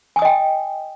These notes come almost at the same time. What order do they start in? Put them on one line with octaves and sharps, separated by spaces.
G#5 D#6 D#5 G5